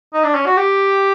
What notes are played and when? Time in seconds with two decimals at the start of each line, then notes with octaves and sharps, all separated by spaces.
0.14 D#4
0.24 D4
0.35 C#4
0.46 F#4
0.57 G4